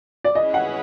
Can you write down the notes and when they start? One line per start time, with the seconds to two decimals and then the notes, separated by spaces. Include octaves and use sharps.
0.24 D5
0.35 C#4 E4 G#4 B4 D#5
0.54 F#5